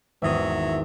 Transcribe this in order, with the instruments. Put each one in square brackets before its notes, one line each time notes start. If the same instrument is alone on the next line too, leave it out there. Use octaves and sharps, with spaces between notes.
[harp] G#1 E2 D#6 [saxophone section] F#3 E5